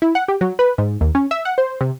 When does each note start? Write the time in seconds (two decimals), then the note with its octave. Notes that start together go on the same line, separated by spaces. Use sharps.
0.02 E4
0.15 F#5
0.28 G4
0.41 F#3
0.59 B4
0.78 G#2
1.01 D#2
1.15 C#4
1.31 E5
1.45 F#5
1.58 C5
1.81 C3